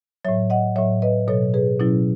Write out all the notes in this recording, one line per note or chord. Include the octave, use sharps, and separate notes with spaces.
A2 F#3 C#5 E5
D#5 F#5
A2 F#3 C#5 E5
B4 D#5
B2 F#3 A4 C#5
G#4 B4
B2 F#3 C#4 E4